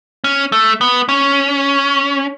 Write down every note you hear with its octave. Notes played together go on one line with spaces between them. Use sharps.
C#4
A3
B3
C#4